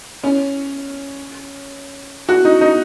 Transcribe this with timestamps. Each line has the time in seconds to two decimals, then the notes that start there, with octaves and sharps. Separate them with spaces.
0.24 C#4
2.29 F#4
2.45 D#4
2.61 D#4